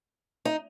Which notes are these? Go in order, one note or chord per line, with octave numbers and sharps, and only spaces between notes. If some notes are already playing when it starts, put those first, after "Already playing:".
D#4